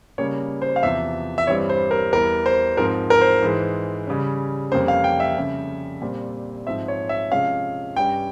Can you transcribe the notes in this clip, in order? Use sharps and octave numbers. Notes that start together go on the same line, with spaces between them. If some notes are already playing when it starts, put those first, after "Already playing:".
C#3 G3 A#3 C#4 C#5
C5
F5
E2 C3 F3 E5
E5
G2 E3 G3 C4 C#5
C5
A#4
E2 E3 G3 A#4
C5
G#2 F3 C4 A#4
A#4
C5
G#2 E3 G#3
C#3 G3 C#4
F2 C3 G3 A#3 C#4 C5
F5
G5
E5
F2 C#3 G3 C#4
A#2 G3 C4
G#2 F3 C4 E5
C#5
E5
C3 F3 G#3 C#4 F5
G2 G3 C#4 G5